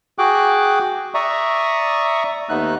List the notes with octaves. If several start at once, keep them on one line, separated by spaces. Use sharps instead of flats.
F#4 G#4 G5 D6 F#6
D5 E5 A#5 C#6 D#6
D#2 A3 B3 D#4 F#6